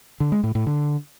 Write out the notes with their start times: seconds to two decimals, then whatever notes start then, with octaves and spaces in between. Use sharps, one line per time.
0.20 D3
0.32 G#3
0.43 A2
0.55 A2
0.67 D3